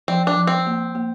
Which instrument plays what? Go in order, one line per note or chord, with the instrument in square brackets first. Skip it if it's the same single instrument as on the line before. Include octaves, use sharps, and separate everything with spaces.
[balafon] F3 [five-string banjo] C4
[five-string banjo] D4
[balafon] F3
[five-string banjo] C4
[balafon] A#3
A#3